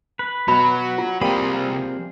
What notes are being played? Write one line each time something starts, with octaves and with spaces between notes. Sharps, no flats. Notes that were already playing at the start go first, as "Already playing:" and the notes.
B4
B2 F#3 B5
F4
C2 F3 G3 A#3 C4 G#4 B5